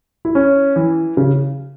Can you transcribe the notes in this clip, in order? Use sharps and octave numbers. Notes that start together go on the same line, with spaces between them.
E4
C#4
E3
C#3